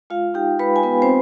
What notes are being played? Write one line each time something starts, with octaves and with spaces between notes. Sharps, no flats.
G#3 F4 F5
D#4 G4 G5
G#3 B4 B5
G#5
B3 B4 B5
C4 C5